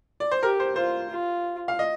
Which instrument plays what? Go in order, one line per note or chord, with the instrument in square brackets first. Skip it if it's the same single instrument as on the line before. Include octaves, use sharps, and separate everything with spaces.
[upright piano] D5
C5
[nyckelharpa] G4 [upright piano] A#4
[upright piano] C5
[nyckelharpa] F4 [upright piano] C5
[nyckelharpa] F4
[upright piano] F5
D#5